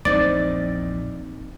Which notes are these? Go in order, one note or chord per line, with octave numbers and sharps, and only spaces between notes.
A#1 E2 A#2 C4 D#4 D5 A6